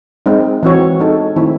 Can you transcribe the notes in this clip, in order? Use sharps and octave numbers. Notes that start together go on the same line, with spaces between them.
G#3 C4 D#4
E3 C4 F#4 C#5
G#3 D#4 A4
D#3 A3 C4 E4